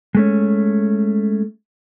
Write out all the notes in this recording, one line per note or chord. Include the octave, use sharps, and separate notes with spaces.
G#3 A3 C#4